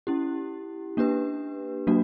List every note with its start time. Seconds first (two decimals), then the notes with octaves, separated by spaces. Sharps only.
0.07 C#4 E4 G4
0.97 A#3 D4 G4 B4
1.87 F#3 A#3 D4 F#4